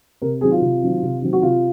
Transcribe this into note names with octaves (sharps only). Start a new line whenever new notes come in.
C3 A#4
D#3 F#3 C4 G#4
F4
C3
D#3 F#3 C4
C3
D#3 F#3 C4
F#4
C3 F4